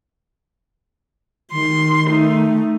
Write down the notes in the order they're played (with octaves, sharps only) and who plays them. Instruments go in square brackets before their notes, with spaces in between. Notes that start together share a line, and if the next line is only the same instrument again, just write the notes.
[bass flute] D#3 [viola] C6
[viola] A3 D#4